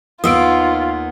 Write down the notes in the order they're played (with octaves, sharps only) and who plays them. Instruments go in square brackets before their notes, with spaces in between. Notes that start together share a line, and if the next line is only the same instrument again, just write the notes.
[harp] D#2 [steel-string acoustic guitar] A#3 B3 [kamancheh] F4 [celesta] D#6 E6 D7